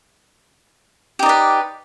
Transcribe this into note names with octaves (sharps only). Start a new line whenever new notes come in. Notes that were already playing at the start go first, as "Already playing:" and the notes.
D#4 G4 B4 D5